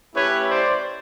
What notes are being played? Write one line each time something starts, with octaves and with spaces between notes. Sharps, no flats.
A3 C#4 E4 G4 B4 C#5
C5 D5